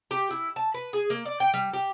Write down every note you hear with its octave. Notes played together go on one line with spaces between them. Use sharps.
G4
E4
A5
B4
G#4
A#3
D5
G5
G3
G4